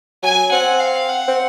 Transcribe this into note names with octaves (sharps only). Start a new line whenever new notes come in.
F#3 G#5
C4 F#5
F5
F#5
C4